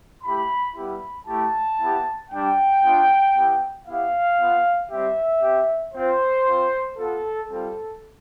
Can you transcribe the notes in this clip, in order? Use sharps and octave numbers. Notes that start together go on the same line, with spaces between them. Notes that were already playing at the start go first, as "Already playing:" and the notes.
A3 E4 G4 B5
G3 B3 E4 G4 B5
A3 E4 G4 A5
B3 E4 G4
G3 D4 G4 G5
B3 D4 F4
B3 E4 G4
B3 E4 G4 F5
B3 F4
G3 C4 G4 E5
C4 G4
C4 F4 C5
C4 F4
B3 F4 A4
G3 C4 F4 A4